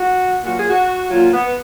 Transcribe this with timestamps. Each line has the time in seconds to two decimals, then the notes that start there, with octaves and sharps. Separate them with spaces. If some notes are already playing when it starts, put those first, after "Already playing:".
Already playing: F#4
0.44 A#2 F#3 F#4
0.56 G#4
0.69 F#4
1.10 A#2 F#3 F4
1.33 B3